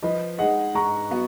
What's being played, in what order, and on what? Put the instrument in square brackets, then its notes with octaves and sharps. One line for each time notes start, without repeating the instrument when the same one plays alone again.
[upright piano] F3 [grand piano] B4 D#5
[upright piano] G#3 D#4 G#4 [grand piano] D#5 F#5
[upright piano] G#2 [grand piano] A#5 C#6
[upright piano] F#3 B3 F#4